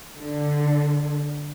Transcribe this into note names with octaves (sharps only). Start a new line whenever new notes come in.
D3